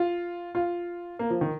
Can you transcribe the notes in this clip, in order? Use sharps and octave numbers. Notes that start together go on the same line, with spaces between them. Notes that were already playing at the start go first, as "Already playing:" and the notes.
Already playing: F4
F4
A#3
F3
D#3